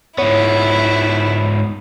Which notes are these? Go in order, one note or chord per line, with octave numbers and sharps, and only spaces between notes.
G#2 B3 E4 C#5